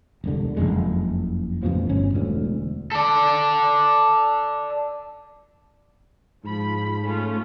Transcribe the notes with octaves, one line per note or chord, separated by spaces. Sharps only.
E1 C2 D3
F#1 C2 F2 G#3
A1 F2 B2 F3
G1 C#4
E1 D2
A4 D5
G#2 F3 B5
A3 C#4 F4